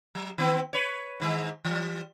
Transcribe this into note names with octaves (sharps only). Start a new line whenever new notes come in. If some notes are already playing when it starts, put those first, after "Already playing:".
F#3
D#3 B3 C4
B4 C#5
G#2 D#3 G#3
E3 G3